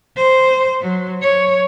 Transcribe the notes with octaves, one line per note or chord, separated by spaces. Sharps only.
C5
F#3
C#5